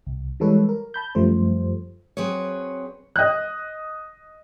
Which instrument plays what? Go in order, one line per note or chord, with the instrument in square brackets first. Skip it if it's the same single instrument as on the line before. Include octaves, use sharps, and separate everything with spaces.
[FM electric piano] C2
E3 G3 G#3 A4 B4 C#5
A#4
A5 B5 G6
F#2 F3 G3 A3 C5
[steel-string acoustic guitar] F#3 C4 G#4 B4 C#5
[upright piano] D#5 F#6